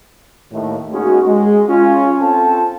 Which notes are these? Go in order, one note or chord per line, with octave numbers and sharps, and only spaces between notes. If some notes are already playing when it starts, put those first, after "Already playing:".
D#2 A2
G#3 A#3 C#4 D#4 F#4
G#3
C#4 F4
C4 F4 A4 G5 A5